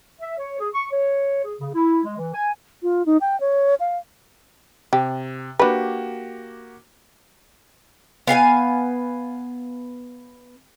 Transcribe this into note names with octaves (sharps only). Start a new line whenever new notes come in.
E5
C#5
G#4
C#6
C#5
G#4
C#3
E4
G#3
E3
G#5
F4
D#4
G5
C#5
F5
C3 G4
A#3 D4 F#4 G4 B4
B3 F5 G5 G#5